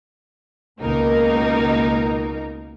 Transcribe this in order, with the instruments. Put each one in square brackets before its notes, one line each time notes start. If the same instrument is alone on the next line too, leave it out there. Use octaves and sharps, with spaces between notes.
[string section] C#2 B2 A#3 D#4 A#4